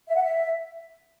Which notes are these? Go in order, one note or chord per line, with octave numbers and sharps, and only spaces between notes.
E5
F#5
E5